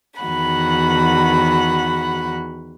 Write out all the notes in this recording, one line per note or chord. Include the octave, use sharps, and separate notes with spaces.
E2 D#3 F#4 F#5 B5